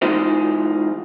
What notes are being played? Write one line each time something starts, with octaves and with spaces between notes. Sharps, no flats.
E3 G#3 D#4 F4 C5